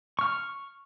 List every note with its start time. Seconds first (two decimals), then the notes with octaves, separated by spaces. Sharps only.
0.19 C#6 F6